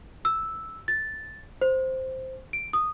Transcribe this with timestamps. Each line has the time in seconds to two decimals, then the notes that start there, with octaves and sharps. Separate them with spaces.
0.25 E6
0.88 A6
1.61 C5
2.53 D7
2.73 D#6